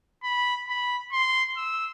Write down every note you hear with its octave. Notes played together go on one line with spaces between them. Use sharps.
B5
B5
C6
E6